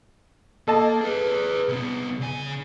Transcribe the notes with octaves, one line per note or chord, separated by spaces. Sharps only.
A#3 A4 D#5 A5
G#4 B4
C2 B3
C#3 G#5